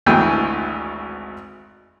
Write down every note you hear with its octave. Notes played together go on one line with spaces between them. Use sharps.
G#1 D2 E3 G5 G#5